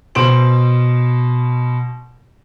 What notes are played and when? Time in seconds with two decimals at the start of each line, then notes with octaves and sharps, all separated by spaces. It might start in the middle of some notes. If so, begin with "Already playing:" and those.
0.15 B2 C5 D7 F#7